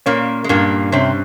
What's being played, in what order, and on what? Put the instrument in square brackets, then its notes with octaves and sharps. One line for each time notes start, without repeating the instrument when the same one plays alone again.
[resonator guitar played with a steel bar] A#2 A#3 [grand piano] C#4
[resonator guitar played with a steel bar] G#3
[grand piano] G2 [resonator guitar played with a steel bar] A#2 A#3
[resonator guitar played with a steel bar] C3 C4 [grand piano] C#4